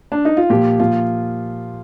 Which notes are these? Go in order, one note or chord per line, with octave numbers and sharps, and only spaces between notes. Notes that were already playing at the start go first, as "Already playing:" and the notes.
D4
D#4
F4
A#2 F3 G4
A#2 F3 F4